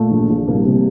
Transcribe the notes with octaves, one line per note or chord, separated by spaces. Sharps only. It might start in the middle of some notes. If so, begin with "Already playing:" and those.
Already playing: A#2 A3
A#1
A#1
C2 A#3
C3